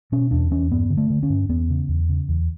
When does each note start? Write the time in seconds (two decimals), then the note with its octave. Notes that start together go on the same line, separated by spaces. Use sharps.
0.12 B2 C#4
0.31 E2 D4
0.51 E2 C#4
0.71 G2 B3
0.90 D3
0.97 A3
1.10 D3
1.23 C#4
1.30 G2
1.49 E2 B3
1.70 C#3
1.88 E2
2.09 C#3
2.29 E2